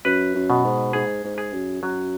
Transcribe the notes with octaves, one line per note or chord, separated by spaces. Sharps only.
F#2 B4
F#2
B2
G#2
G#2 G#4
G#2
G#4
F#2
F#2 F#3